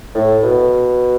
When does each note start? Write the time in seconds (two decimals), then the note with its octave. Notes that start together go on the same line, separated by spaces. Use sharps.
0.15 A2
0.43 B2